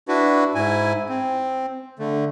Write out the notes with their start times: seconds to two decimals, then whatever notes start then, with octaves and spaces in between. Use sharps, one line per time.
0.08 D4 E4 F#4 B4
0.55 G#2 E4 G#5
1.09 C4
1.99 D3 A3